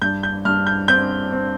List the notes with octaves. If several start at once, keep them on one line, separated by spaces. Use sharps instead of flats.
G2 G6
G6
G2 F6
G6
C4 G6
C4